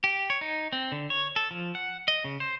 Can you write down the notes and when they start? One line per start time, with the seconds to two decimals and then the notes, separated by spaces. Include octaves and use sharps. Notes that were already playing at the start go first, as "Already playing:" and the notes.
0.04 G4
0.30 C#5
0.41 D#4
0.73 C4
0.92 D3
1.10 C#5
1.36 A4
1.51 F3
1.75 F#5
2.08 D#5
2.24 C#3
2.40 C5